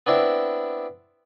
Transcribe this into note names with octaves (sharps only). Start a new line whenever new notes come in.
B3 C4 D4 E4